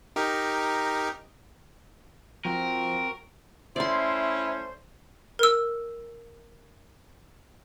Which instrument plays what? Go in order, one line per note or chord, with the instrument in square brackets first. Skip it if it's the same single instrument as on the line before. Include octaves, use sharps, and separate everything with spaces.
[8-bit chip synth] D#4 G4 A#4
[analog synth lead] F3 [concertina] C4 F#4 [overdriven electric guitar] A#4
[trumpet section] A3 C#4 [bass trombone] E4 [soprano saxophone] C5 [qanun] D5 C6
[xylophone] A#4 E6